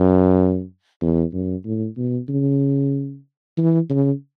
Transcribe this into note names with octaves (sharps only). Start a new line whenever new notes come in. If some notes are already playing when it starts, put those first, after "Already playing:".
Already playing: F#2
E2
F#2
A2
B2
C#3
E3
C#3